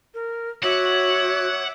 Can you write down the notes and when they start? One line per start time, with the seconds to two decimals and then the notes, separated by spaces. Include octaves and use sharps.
0.14 A#4
0.63 F#4 C#5 E5 F#5 D6